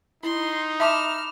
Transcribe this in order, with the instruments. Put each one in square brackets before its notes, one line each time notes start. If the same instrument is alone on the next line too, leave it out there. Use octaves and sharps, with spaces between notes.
[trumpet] D#4 [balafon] E4 [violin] C6
[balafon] E5 A5 C6 [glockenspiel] B5 D6 E7 [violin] F6